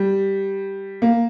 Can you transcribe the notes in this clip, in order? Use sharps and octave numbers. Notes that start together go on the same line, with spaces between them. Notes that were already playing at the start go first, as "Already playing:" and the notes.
Already playing: G3
A#3